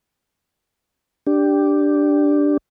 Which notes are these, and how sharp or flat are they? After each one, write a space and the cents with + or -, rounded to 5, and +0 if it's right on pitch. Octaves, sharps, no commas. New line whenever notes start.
D4 +0 G4 +0